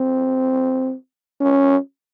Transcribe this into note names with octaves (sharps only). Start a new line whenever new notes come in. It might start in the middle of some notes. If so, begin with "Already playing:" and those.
Already playing: C4
C#4